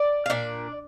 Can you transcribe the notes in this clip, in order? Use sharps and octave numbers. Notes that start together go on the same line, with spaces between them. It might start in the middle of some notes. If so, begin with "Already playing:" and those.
Already playing: D5
F5
A#2 D4 D5